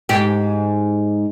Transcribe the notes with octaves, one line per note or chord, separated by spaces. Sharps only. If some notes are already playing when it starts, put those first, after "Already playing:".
G#2 G4